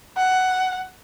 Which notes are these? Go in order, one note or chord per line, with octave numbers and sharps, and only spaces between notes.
F#5